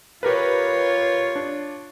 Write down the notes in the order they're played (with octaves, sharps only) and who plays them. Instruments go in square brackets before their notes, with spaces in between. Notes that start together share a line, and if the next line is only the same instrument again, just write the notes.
[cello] F4 C#5 [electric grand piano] G4 A#4 B4
[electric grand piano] D4